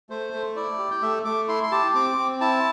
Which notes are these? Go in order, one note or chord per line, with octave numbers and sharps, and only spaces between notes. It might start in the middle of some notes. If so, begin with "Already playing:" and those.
A3 C5
A3
E4 D5
G4
G5
A3 E5
A3 D6
E4 C6
C6
G4 A5
C4 D6
C4
E4 A5